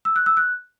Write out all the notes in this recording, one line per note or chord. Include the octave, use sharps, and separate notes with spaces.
E6
F#6
E6
F#6